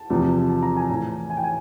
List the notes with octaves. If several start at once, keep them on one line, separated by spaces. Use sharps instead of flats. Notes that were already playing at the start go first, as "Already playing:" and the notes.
Already playing: A5
E2 C3 F3
A5
A#5
G#5
A2 E3
G#5
G5
G#5